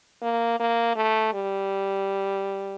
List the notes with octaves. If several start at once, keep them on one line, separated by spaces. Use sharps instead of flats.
A#3
A#3
A3
G3